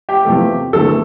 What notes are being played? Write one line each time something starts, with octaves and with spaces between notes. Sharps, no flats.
G4
E2 C3 F3 A3
E2 D3 A3 A4